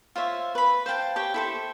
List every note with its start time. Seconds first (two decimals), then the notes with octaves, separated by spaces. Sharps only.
0.16 F4 C5 C#5 E5
0.55 B4 B5
0.86 C5 F5 G5 A5
1.16 G4 C#5 G5
1.34 E4 A4 C5